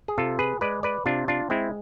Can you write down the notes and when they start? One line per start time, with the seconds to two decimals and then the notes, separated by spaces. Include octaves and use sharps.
0.08 G#4
0.18 C3 F4 A4
0.39 G#4 B4
0.61 G#3 B4 D5
0.83 B4 D5
1.06 C3 D4 F4
1.28 D4 F4
1.50 G#3 C4 E4